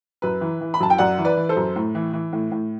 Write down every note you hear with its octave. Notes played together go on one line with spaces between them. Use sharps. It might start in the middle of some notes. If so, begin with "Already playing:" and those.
F#2 B4
E3
E3
B5
F#2 A5
G5
F#2 D5 F#5
E3
B4 D5
E3
A4 C5
F#2
A2
E3
E3
A2
A2